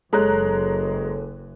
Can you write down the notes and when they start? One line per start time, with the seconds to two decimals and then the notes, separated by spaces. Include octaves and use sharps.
0.13 F#1 F#2 G#3 A4 C#5 A#5 F#6